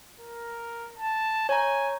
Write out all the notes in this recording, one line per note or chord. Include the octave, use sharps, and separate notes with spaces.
A#4
A5
C#5 G#5 A#5